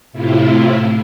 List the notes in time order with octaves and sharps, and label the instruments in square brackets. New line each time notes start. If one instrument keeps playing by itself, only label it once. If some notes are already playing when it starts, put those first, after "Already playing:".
[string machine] A2 C3 E4 F4